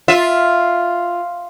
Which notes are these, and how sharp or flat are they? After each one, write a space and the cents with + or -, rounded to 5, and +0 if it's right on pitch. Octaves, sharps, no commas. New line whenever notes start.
F4 +0 E5 +0